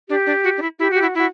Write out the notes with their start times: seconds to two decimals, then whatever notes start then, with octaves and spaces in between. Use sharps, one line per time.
0.09 D4 G4
0.26 D4
0.44 F#4
0.58 D4
0.62 E4
0.79 E4 G4
0.91 F#4 G4
1.02 E4 F#4
1.15 E4 F#4